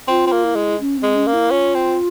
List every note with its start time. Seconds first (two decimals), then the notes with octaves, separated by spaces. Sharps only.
0.08 C4 F4
0.27 C4
0.32 A#3
0.44 E4
0.56 G#3
0.80 C#4
0.97 C4
1.03 G#3
1.15 C#4
1.27 A#3
1.33 E4
1.51 C#4 F4
1.75 C4